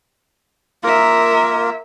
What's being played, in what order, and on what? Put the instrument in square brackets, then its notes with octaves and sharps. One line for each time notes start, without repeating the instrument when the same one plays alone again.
[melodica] A#3 F4 [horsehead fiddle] A#4 E5